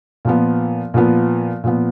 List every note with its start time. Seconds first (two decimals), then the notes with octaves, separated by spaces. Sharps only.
0.25 A#2 F3 B3
0.94 A#2 F3 B3
1.64 A#2 F3 B3